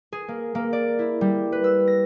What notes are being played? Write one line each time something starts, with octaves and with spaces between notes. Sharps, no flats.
G#4
A#3
A#3
D5
E4
G3
B4
E6
A#6